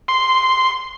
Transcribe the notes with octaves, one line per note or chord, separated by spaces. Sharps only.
C6